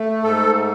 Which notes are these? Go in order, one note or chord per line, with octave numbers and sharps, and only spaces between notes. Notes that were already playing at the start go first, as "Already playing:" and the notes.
Already playing: A3
G#2 A4